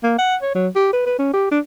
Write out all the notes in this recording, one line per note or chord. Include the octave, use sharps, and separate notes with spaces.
A#3
F#5
C#5
F#3
G4
B4
B4
C#4
G4
D4